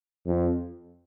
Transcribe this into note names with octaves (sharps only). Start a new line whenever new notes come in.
F2